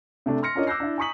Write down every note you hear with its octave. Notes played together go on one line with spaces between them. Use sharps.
C3 A3 D4
C6 F6 A#6 C#7
C#4 D4 F4 A#4 C#5 D#5
D6 E6 F#6 G6 A#6 C7
D4 E4
G#5 A#5 C#6 D#6 B6 F#7